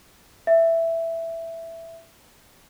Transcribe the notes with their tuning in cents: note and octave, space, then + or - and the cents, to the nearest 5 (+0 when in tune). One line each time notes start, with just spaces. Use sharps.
E5 +5